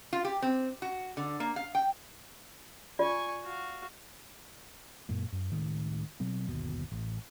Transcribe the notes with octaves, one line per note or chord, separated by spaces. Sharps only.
F4
G4
C4
F#4
D3
A#3
F5
G5
F4 D5 G#5 C#6
F#4 F5
F#2 A#2 A#3
F#2
C#2 A2 D#3
B2 F#3 C4
G1 D#2 B2
A1